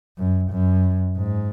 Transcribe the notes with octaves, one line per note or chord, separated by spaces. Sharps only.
F#2
F#2
G#2